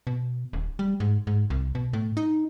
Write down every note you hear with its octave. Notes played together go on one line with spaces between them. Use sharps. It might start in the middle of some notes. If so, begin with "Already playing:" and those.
B2
D#1
G3
G#2
G#2
C2
B2
A2
D#4